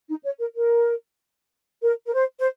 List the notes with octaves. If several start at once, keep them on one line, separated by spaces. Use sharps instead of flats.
D#4
C#5
A#4
A#4
A#4
A#4
C5
C5